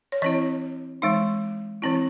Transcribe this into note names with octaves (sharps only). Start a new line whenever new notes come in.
C#5
E3 C4 E4 D#5
E3 G#3 D#4
E3 C4 E4